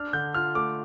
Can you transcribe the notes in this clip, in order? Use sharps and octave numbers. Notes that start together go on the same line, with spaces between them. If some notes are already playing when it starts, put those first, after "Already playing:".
Already playing: D4 F6
D3 G6
F4 F6
A3 D6